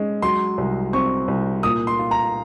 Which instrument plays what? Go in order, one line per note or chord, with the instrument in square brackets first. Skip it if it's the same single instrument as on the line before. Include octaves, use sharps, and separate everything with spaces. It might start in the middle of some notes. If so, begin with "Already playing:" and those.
Already playing: [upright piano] G#3 C#4
[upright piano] F#3 [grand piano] C6
[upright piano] C2
[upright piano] C4 [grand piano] C#6
[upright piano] C2
[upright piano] A#2 [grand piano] D#6
[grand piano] C6
[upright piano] F4
[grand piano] A#5